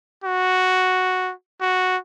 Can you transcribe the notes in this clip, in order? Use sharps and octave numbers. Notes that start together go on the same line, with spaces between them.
F#4
F#4